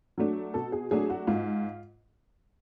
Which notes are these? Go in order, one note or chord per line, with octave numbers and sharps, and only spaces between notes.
F#3 A3 D4
B2 A4
G#4
F#3 A3 D4 G#4
F#4
G#2 F4